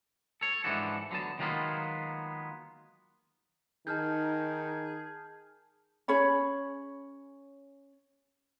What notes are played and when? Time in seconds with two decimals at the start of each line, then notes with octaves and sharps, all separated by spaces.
0.41 A4 C#5
0.64 G#2 E3 F3 D4 F#4 A4
1.11 D3 F#3 B3 A5
1.39 D#3 F#3 G#3 A#3 B3 F4
3.87 D#3 D#4 G#4 A5 F6 G6
6.08 C#4 G#4 C#5 B5